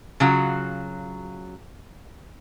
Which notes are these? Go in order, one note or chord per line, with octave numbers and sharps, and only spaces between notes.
C#3 F#3 F4 F#4